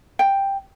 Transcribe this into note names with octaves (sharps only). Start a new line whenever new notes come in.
G5